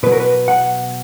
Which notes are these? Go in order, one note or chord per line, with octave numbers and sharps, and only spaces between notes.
B2 F#3 B4
A#4
B4
F#5